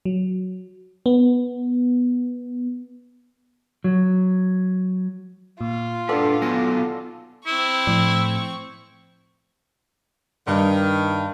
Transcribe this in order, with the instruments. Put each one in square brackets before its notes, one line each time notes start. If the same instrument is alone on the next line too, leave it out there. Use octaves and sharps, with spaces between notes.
[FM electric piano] F#3
B3
[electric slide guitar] F#3
[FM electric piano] A#2 [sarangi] F4
[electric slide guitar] D4 B4 [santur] A4 D5 F#5
[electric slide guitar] F#3 B3 G#5 [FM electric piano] D6 A#6
[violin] C4 C#6 [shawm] E4
[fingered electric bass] A2 [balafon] F3
[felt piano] G2 [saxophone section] D#3